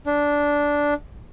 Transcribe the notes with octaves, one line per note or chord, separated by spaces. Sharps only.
D4